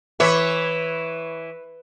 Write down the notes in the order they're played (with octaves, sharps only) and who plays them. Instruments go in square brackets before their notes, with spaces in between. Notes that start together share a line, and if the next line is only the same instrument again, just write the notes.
[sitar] E3 C#5 E5 [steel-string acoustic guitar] B4